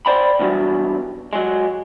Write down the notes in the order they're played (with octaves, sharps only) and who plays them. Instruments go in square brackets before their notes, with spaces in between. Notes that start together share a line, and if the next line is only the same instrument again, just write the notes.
[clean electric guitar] C5 D5 G5 B5
E2 G2 B2 F#3
F#3 G#3